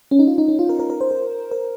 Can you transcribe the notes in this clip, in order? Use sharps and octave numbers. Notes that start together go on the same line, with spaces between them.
C#4
D#4
F4
D#4
C#4
F4
A#4
A#4
A#4
C5
A#4
A#4